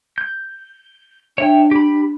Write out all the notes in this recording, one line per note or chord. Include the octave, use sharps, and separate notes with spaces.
G6
D4 C#5 E5 G5
G4 B5